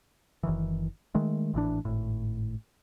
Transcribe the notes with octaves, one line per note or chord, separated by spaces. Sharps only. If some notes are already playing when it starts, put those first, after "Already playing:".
F#1 D#3 E3
D#3 G#3 A3
G#1 A2 E3 D4
G#1 A2